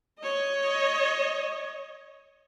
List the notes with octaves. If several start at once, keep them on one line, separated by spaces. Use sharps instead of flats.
C#5 D#5